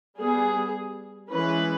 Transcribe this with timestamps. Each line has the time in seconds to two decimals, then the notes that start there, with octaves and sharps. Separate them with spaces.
0.19 G3 B3 G#4
1.32 E3 G#3 C#4 B4